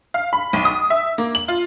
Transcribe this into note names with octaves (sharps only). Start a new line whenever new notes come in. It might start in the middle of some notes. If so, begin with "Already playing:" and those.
F5
B5
B1
D#6
E5
A#3
F#7
F4